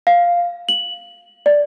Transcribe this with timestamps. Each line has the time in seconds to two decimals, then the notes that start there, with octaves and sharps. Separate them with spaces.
0.07 F5
0.69 F#7
1.46 D5